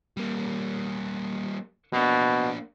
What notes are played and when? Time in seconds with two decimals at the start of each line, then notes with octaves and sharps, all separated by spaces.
0.17 G3 A#3
1.93 B2 A#3 D4